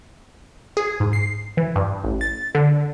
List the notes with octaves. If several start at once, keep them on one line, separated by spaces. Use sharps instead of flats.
G#4
G#2
C7
E3
G2
A1
A6
D3